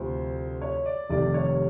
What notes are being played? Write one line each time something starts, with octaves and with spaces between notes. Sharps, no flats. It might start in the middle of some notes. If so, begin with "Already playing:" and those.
Already playing: D2 C3 F3 C5
C#5
D5
F1 F2 C3 D#3 D5
C#5